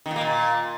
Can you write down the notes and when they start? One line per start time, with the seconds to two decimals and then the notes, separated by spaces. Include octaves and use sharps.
0.06 D#3
0.11 A#2
0.16 A#3
0.21 A#2